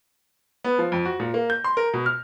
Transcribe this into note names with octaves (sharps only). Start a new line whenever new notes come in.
B3
F3
F2
F#4
A#2
A#3
G6
C6
A#4
B2
F6